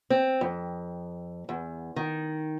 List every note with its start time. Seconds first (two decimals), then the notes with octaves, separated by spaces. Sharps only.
0.10 C4
0.41 F2
1.49 E2
1.96 D#3